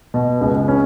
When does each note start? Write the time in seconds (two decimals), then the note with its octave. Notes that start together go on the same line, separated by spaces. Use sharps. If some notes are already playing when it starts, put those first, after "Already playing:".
0.14 B2
0.41 C#2
0.68 C#4